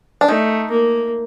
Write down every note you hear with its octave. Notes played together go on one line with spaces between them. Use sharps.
D4
A3 D#4
A#3